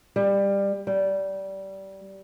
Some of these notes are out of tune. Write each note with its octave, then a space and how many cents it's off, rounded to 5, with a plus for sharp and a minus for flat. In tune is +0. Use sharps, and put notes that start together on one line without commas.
G3 +20
G3 -20